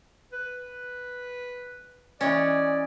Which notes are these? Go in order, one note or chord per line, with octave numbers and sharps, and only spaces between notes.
B4
E3 G#3 C#4 D5